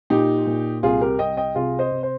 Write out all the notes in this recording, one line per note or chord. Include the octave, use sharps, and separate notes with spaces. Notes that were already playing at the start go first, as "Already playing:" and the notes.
A#2 D#4 G4
A#2
C2 F4 G#4
G4 A#4
C2 D#5 G5
D#5 G5
C3 F4 G#4
C5 D#5
C3
C5